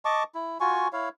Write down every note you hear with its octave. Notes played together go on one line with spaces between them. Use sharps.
D#5 A5 C#6 D6
E4
F4 F#4 G#5 C#6
E4 C#5 F5